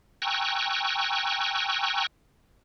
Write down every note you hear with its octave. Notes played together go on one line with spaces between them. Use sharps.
G5 G#5 A#5 C#6 E6 F#6